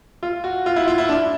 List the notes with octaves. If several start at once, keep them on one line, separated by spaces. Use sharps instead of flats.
F4
F#4
F4
E4
F4
E4
D4